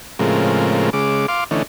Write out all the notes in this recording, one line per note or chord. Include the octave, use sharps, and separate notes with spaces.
A2 C#3 F3 G#3 C4 A#4
C#3 G#3 D6
F5 C6 D6
D3 E3 A3 C#4 D#4